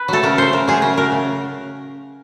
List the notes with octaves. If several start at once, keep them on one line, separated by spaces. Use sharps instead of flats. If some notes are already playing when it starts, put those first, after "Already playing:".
Already playing: B4
F#3 A3 A4
C#3 A#4
F#3 A3 C5
C#3 A#4
F#3 A3 G#4
C#3 A#4
F#3 A3 A#4
C#3